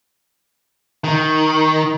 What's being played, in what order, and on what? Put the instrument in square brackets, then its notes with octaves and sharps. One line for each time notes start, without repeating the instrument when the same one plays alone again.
[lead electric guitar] D#3